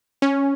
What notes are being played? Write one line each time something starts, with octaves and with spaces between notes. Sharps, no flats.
C#4